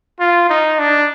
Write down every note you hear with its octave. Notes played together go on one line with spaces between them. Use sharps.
F4
D#4
D4